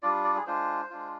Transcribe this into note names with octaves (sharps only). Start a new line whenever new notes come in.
G3 D4 F4 D5
D5
G#4
G#3 D4 F4 C5
G#3 D4 F4